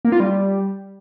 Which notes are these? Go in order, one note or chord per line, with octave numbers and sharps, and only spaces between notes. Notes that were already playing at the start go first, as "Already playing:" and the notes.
A#3
F4
G3